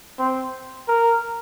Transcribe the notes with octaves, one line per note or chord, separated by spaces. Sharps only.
C4
A#4